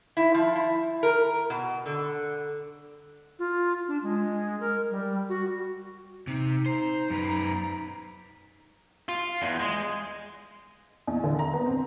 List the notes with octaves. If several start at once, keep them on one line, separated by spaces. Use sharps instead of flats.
E4
F3
E4
A#4
B2
D3
F4
D4
G#3
A#4
G3
F#4
C3 D#4
C5 A#5
F#2 B4
F4
E2
G#3
E2
D3
A#5
B3
C4